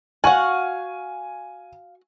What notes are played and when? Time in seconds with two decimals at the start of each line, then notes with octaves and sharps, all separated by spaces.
0.24 F#4 F5 F#5 G#5 C#6